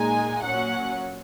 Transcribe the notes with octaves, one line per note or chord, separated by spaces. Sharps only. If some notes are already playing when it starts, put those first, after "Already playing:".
Already playing: A#2 G#3 D#4 G#5
A#2 F#3 C#4 F#5